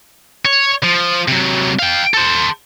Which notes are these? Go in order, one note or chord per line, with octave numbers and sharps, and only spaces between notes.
C#5
F3
C3 F#3
F5 G5
A4 C5